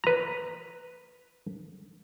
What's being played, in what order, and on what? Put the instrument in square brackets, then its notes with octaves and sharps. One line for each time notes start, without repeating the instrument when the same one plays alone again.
[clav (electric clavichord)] B4 A#5